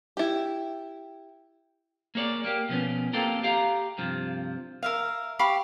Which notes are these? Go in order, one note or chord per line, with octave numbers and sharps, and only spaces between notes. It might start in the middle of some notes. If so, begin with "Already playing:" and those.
E4 G4
A#3 G#4 C#5 D5
A#3 G4
B2 F3 B3 C#4
A#3 C4 F4 G4 A4 A#4
G4 F5 A#5
G2 C3 F3
A#4 E5 F5
G4 F5 B5 C#6